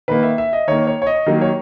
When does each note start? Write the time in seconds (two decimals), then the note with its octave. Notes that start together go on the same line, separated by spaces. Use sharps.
0.08 D#3 A#3 B4
0.23 E5
0.38 E5
0.53 D#5
0.67 D#3 A#3 C#5
0.87 C#5
1.02 C#5
1.07 D#5
1.26 D#3 F#3 A#3
1.41 C#5